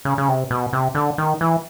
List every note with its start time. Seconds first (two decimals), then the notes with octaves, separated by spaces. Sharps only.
0.05 C#3
0.18 C#3
0.28 C3
0.51 B2
0.73 C3
0.95 D3
1.18 D#3
1.41 E3